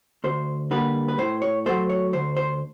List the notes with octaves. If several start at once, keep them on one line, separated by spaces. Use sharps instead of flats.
D2 C5
D3 G3 A#3 B4
B4
A2 C5
C#5
F#3 A3 C5
C#5
D2 C5
C5